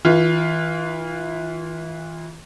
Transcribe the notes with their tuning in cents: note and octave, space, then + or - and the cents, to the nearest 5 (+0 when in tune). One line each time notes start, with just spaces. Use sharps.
E3 -30 F4 +0